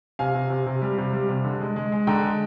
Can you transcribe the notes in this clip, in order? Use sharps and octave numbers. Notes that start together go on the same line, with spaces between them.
C3 F5 G#5
C3
C3
C3
G3
C3
G3
C3
D3
G#3
G#3
G#3
D3 G5 A#5
G#3